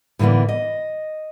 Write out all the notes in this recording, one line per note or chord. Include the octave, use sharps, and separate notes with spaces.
A2 D3 E3 A#3 B3
D#5